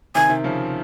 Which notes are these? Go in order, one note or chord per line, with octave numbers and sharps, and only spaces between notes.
C3 D#3 G#5
C3 D#3
C#3 F3